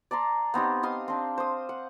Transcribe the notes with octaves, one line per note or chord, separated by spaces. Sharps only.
D5 A5 A#5 C6
B3 C4 D#4 G4
D#5 F5 C6 D#6
C4 D4
C5 D#6
F#5